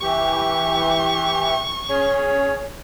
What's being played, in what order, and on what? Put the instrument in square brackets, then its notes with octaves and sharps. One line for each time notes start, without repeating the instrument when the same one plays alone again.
[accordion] E3 G4 [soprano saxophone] C#6
[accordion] C#4 G#4 [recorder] C#5